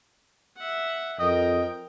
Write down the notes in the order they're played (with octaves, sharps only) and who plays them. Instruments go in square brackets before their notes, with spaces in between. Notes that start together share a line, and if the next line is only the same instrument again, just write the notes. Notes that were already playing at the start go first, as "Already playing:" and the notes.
[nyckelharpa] E5 F#5
[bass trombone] F2 [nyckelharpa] A#4 G5 [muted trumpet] D#5